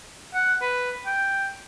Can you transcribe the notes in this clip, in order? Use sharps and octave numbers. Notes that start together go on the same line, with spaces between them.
F#5
B4
G5